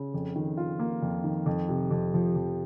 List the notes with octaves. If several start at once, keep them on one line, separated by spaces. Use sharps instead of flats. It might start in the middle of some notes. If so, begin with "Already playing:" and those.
Already playing: C#3
F2
D#3
F4
A#3
F2
D#3
F2
C3
F2
F3
F2